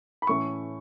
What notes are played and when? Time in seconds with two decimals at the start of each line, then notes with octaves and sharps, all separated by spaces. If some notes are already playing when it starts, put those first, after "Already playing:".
0.22 B5
0.27 A2 E3 A3 C#4 C#6